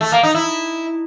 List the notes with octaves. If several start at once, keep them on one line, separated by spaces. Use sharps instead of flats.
A3
A#3
D#4
E4